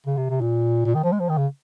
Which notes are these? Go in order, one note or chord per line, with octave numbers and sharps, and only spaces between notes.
C#3
C3
C3
A#2
A#2
D#3
F3
G#3
F3
D#3
C#3